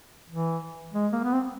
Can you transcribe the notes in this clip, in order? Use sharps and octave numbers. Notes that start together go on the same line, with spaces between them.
E3
G#3
A#3
B3
C4